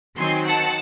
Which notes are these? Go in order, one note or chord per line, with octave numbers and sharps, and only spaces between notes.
D#3 F#3 C4 G#5 C6
F#5 A5